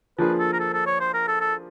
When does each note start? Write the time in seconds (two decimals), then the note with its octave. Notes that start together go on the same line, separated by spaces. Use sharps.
0.18 F3 A#3 D4 F4 G#4 B4
0.39 A4
0.53 A#4
0.60 A4
0.73 A4
0.87 C#5
1.00 C5
1.14 A#4
1.28 A4
1.40 A4